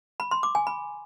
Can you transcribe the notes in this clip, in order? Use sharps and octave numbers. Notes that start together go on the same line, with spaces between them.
B5
C6
D6
G#5
B5